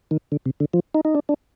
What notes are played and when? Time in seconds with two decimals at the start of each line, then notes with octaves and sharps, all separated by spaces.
0.11 D#3
0.32 D3
0.46 C3
0.60 D3
0.74 F3
0.95 D#4
1.05 D#4
1.15 D4
1.29 D4